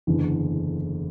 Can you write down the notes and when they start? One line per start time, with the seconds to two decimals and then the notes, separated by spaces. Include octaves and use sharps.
0.07 F#1 E2 D3